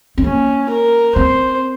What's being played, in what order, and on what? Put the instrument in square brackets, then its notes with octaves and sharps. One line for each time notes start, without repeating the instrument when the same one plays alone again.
[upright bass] C4
[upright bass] A#3 [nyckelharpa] C#4
[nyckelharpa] A#4
[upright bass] C4 [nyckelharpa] C5